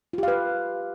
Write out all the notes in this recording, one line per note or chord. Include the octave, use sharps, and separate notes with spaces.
F4 G4 B4 F5